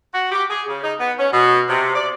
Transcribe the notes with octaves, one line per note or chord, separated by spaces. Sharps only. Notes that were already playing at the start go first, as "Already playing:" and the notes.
F#4
G4
G#4
C#3
D#4
B3
C#4
B2
C3
D5